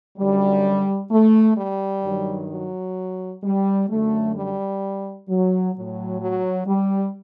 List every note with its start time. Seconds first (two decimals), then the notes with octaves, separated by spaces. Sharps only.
0.18 F#2 D3 F#3 G3
1.11 A3
1.57 G3
2.03 G2 D#3 F#3
2.50 F#3
3.43 G3
3.89 F#2 D3 F#3 A3
4.35 G3
5.29 F#3
5.74 A2 F#3
6.21 F#3
6.67 G3